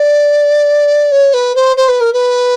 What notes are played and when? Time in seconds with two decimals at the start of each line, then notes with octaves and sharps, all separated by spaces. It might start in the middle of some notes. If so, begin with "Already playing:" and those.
Already playing: D5
1.11 C#5
1.33 B4
1.55 C5
1.76 C5
1.88 B4
2.00 A#4
2.12 B4